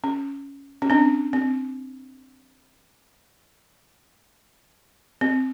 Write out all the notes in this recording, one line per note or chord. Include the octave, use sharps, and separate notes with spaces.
C#4
C#4
C4 D4
C4
C4